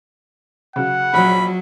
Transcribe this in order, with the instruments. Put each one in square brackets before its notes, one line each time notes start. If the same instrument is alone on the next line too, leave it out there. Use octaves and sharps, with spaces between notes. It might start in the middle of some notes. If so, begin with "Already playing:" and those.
[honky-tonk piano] C#3 F#3 [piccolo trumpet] F#5
[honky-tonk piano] A#1 C#4 [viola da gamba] F#3 [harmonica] B5